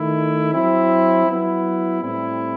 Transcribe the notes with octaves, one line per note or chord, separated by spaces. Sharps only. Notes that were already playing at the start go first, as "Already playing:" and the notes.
Already playing: D#3 A3 E4
F#3 C4 E4
F#3 B3 E4
A2 G3 C4 E4